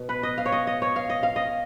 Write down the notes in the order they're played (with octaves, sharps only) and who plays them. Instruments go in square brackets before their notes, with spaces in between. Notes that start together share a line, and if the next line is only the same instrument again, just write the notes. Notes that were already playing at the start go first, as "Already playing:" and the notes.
Already playing: [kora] B2
B4
D#5
F5
C#5
D#5
D#5
C#5
F5
D#5
F5
D#5